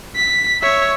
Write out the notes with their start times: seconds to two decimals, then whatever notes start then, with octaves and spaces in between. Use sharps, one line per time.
0.16 B6
0.62 C#5 E5